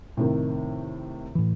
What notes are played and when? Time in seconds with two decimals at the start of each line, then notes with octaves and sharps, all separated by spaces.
0.17 A2 C3 D#3
1.35 A2 E3